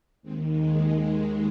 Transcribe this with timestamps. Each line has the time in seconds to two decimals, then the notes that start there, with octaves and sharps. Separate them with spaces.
0.22 D#2 D#3 G#3 C4
0.51 G#3
0.80 G#3